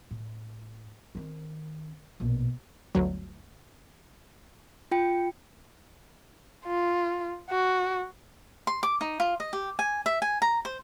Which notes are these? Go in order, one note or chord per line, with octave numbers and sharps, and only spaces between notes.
A2
D#3 C4
A#1 B2
G1 D2 F#3
F4 G5 C#7
F4
F#4
C6
D6
D#4
F4
D#5
G4
G#5
E5
G#5
A#5
C5